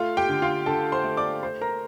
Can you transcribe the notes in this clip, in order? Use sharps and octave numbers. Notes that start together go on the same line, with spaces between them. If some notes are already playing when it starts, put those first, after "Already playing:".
Already playing: A3 F4 F5
G4 G5
D3
F4 F5
D3 A4 A5
C5 C6
A3
D5 D6
A3 C5 C6
A#4 A#5